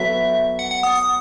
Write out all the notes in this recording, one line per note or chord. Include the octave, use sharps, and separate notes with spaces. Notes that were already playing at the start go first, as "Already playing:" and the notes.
Already playing: F#3 B3 F#4 A4 E5
F#5
F#5
D#6
D#6